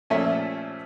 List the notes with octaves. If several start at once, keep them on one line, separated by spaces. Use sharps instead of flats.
A#2 F3 A3 C#4 E5